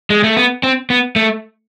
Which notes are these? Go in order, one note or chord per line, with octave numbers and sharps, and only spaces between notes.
G#3
A3
B3
C4
B3
A3